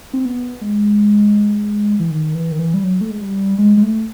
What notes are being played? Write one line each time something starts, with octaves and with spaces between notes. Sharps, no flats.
C4
B3
G#3
E3
D#3
E3
D#3
E3
G3
F#3
A3
G#3
G3
G#3
G#3
A3